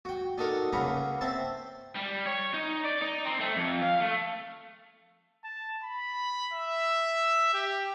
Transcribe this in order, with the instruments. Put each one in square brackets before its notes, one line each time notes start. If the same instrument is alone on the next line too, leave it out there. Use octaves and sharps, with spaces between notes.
[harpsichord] F#4 G5
D4 D#4 F#4 A4 A#4
C#2 C#3 A#3 F#5 A#5 B5
C4 C5 E5 A5
[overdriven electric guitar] G3
C#5
D#4
D5
D#4
C4
A3
F2
F5
A3
[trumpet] A5
B5
E5
G4